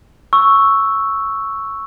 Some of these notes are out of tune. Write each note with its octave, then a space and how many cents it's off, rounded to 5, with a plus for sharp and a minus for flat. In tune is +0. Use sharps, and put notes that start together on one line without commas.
C#6 +0 E6 +0